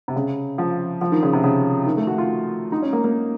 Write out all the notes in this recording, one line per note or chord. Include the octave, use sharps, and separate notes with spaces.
C3
C#3
F3
F3
D#3
C#3
C3
C#3
D#3
A3
F#4
F4
D#4
C#4
A#3
A#3